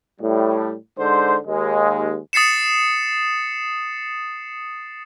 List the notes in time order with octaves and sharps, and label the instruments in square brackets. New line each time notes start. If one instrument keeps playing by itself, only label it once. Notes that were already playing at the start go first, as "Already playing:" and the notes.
[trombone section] A2 G3
G#2 D3 C5
D#2 G#3
[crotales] D#6 A6 C7 C#7 E7